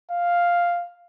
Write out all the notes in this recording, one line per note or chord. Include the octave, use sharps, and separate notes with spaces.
F5